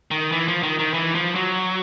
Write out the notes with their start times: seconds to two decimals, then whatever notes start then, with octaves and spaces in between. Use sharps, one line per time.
0.11 D#3
0.32 E3
0.48 F3
0.63 D#3
0.79 D#3
0.94 E3
1.15 F3
1.35 F#3